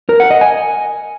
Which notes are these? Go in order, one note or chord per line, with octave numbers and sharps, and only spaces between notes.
A#4
F#5
D#5
G#5